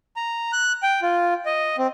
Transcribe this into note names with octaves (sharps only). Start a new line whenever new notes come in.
A#5
F#6
G5
F4
D#5
C4